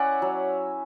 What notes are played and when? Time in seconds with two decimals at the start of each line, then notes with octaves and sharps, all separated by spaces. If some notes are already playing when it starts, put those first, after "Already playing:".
Already playing: C#4 E4 D5 E5 F#5 G#5
0.22 F#3